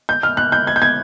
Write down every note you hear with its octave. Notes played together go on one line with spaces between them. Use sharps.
G6
F6
F#6
G6
G#6
G6
G#6